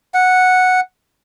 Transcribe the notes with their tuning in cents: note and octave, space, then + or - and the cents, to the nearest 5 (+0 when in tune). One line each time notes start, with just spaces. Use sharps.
F#5 -5